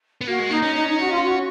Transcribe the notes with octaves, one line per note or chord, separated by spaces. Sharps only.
B3
A#3 F#4
G#3
A#3 D#4
C#4
D#4
D#4
F#4
F4
F#4